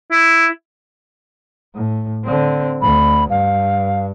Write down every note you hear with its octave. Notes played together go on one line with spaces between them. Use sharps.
E4
A2
D3 C4
D2 B5
G2 F5